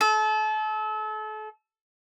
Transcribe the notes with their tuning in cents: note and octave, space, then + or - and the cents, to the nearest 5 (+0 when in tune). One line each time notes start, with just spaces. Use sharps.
A4 -35